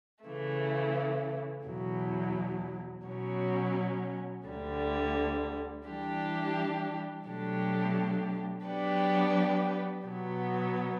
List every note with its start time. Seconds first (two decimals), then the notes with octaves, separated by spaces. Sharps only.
0.24 C#3 E3 A3
1.65 E2 B2 F#3
3.05 B2 F#3 C#4
4.46 D2 D3 G3
5.85 E3 G3 D4 G4
7.26 B2 F#3 A3 D4 G4
8.66 F#3 B3 D4 G4 B4
10.06 B2 F#3 B3